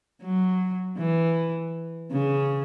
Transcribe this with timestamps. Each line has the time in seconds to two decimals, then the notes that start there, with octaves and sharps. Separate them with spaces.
0.21 F#3
0.98 E3
2.12 C#3